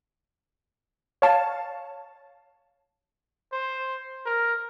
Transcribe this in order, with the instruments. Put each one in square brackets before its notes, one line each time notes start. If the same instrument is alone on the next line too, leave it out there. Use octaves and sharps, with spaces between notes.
[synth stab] C#5 F5 A5
[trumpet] C5
A#4